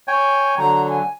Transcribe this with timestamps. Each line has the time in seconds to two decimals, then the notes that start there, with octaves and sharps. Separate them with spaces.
0.08 C#5 G5 G#5
0.58 D3 F#3 A#5
0.89 G#5